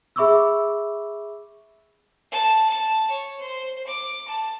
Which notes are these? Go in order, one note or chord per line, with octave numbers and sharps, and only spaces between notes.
G#4 E5 B5 C#6 D6 E6
A5
A5
C#5
C5
D6
A5